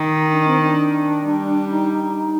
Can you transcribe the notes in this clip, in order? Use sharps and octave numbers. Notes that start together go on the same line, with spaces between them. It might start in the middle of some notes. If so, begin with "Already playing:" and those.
Already playing: D#3 D#4
D4
C4
D4
G3
D#4
D#4
D#4